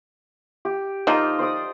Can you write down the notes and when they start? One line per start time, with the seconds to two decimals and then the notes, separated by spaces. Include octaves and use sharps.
0.65 G4
1.07 F3 A#3 D#4 F4
1.39 C5 D5 D#6